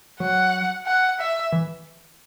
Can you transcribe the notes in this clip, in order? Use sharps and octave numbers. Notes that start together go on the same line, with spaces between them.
F#3 F#5
F#5
E5
E3